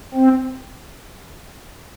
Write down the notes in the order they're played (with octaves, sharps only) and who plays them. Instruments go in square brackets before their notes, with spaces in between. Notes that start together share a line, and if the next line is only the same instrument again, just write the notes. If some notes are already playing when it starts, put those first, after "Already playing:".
[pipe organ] C4